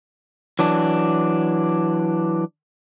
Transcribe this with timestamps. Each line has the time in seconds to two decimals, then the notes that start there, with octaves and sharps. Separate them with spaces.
0.59 E3 F#3 D4